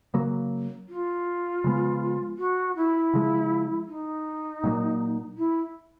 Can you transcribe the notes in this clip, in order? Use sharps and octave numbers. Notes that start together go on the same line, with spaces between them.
C#3 F#3 A#3
F4
C#3 F3 G#3 B3
F#4
E4
C#3 F3 G#3
D#4
A#2 F#3 A#3
E4